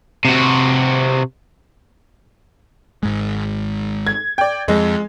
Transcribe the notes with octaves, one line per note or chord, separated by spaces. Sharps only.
C3 F#4
G#1 G#2 G#3
G#6
D5 G5
F2 G#3